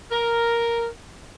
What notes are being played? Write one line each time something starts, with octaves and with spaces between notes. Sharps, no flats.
A#4